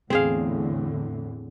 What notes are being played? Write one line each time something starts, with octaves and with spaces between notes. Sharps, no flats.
E2 A2 D3 C4 G#4 F5